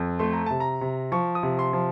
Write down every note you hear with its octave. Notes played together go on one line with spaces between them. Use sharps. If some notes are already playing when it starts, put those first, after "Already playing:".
Already playing: F2
A3 C6
A#5
C3 A5
A#5
C3
F3 C#6
D#6
C3
C6
F3